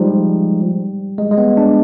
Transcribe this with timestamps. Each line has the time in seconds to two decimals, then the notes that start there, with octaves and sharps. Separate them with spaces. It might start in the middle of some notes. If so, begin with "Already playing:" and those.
Already playing: F3 G3 G#3 D#4
1.18 G#3
1.31 G#3
1.38 B3
1.57 D4